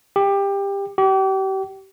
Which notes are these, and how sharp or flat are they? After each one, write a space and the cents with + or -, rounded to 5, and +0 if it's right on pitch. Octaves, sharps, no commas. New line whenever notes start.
G4 +20
G4 -35